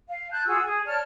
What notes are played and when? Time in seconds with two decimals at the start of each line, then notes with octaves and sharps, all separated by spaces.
0.08 F5
0.32 A5 F#6 G6
0.47 F4 F#4 G#4 E6
0.64 G#4 G#5
0.86 C#5 D5 A5 F6